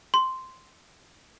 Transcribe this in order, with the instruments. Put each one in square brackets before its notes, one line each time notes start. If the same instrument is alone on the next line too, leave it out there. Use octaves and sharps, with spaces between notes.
[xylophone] C6